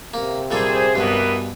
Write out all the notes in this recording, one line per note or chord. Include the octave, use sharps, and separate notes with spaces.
C3 A#3
A#2 G3 G#4 A4 C5
G2 B2 E3 A#3 B3